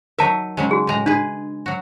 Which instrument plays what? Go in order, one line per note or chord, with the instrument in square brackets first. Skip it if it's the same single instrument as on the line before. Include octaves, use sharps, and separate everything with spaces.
[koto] F#3 D#4 E5 [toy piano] A#4 A5
[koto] C#3 F#3 G#3
[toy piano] F#4 G#4
[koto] A2 G#3 A#5
[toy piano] D4 [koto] G#4 B4
[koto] F#3 F#4